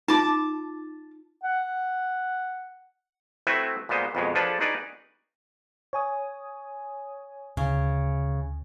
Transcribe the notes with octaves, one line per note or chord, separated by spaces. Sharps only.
D#4 F4 A5 D6
F#5
A3 C4 E4 F#4 B4 E5
A#2 G#3 B3 C5 D#5
F2 B2 G#3
F3 D4 G#4 A4 B4
D#4 F#4 G#4 B4 D5
C#5 G#5 D#6
D2 C#3